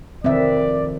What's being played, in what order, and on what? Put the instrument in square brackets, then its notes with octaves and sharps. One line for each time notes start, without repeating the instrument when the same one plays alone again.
[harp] F1 D#3 B4 [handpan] C4 E5 [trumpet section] D5